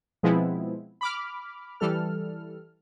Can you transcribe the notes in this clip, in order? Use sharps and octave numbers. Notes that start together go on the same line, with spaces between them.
B2 F3 G#3 B3 C4 E4
B5 D6 F6
E3 G3 A4 F6